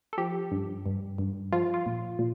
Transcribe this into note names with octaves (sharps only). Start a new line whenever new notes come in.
A4
F3 G4
G2
G2
G2
F3 F4
F4
A#2
A#2